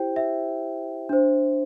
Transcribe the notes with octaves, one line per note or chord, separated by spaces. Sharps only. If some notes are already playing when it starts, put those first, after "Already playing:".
Already playing: E4 G4 C5 G5
E5
D4 C5